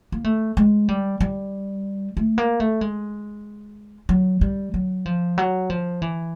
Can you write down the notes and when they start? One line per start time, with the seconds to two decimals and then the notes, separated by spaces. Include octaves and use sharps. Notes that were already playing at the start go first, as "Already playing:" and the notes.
0.12 A#3
0.24 A3
0.57 G#3
0.89 G3
1.21 G3
2.17 A3
2.38 A#3
2.60 A3
2.81 G#3
4.09 F#3
4.41 G3
4.74 F#3
5.06 F3
5.38 F#3
5.70 F3
6.02 E3